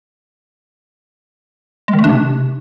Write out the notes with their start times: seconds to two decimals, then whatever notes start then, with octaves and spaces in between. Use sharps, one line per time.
1.88 G#3
1.93 D#3
1.99 A3
2.04 D4
2.09 C3